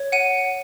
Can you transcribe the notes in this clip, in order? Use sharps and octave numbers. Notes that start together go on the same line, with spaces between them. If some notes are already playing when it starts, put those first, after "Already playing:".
Already playing: C#5
F#5 D#7